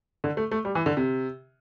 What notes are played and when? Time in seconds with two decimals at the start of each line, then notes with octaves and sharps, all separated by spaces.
0.24 D3
0.37 A3
0.51 A3
0.65 G3
0.75 E3
0.86 D3
0.97 C3